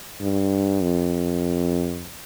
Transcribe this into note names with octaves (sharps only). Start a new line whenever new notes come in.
G2
F2